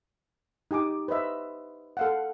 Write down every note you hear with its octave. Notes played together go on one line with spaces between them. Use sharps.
D#4 G4 G#5 D6
B4 C5 D#5 E5
A4 F5 F#5